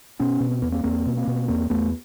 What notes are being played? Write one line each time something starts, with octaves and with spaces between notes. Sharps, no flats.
B2 B3 C#4
B2
C4
E2 B3
A#3 C4
E2 A#3 C4
B2
A#3 C4
B2
E2 A#3 C4
E2 A3 B3